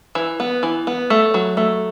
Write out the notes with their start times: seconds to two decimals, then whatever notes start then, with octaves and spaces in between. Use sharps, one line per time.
0.15 E3
0.40 B3
0.63 E3
0.87 B3
1.10 A3
1.34 F#3
1.57 A3